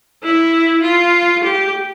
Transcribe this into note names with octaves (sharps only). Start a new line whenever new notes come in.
E4
F4
G4